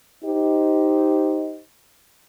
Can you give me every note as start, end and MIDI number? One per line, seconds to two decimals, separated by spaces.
0.23 1.60 63
0.23 1.60 67
0.23 1.60 72
0.23 1.60 75